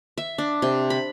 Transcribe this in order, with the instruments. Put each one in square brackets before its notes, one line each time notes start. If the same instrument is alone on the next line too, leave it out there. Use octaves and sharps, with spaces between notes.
[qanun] E5
D4
C3
B5